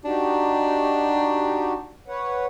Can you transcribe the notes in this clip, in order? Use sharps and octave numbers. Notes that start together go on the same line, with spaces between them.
D4 D#4 F#4 G4
B4 C#5 F#5